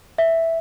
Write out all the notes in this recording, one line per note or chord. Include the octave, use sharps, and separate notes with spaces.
E5